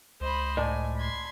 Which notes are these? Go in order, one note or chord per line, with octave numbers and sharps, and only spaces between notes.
C#2 C5 D#5 B5
A2 D5 D#5 G#5 A5
B5 C6 G#6